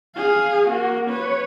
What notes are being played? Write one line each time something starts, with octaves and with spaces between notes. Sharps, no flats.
G#4 F5
A#3 F#4
B4 C#5